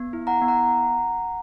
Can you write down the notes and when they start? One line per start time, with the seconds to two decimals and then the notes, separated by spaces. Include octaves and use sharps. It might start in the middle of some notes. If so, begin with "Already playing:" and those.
Already playing: B3
0.13 E4
0.27 F#5 A#5
0.41 B3
0.48 F#5 A#5